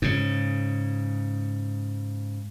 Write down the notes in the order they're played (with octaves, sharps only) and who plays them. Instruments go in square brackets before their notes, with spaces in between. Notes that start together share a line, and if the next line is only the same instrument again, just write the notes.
[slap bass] G#2 C#3